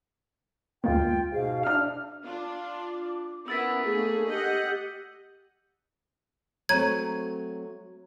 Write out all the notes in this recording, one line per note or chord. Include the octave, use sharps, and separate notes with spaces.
D2 G#3 A#3 F4 G5
G#2 B2 F5
D4 E5 F6
D4 F4 D6
B3 C#4 E4 A#4 F#5 E6 A6 B6
A3 A#3 D4 G#4
G4 D#5 F#5 G6
F#3 A3 C4 C#5 A#5 G#6 D#7